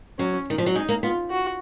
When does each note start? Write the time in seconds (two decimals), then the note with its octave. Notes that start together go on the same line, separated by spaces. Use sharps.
0.18 F#3 C#4
0.50 D#3
0.58 F3
0.66 F#3
0.74 G#3 D#4
0.89 A#3
1.03 B3 F4
1.31 F#4